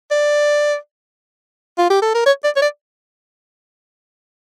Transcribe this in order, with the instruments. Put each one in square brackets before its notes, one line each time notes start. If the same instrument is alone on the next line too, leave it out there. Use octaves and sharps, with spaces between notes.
[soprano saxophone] D5
F4
G4
A4
A#4
C#5
D5
C#5
D5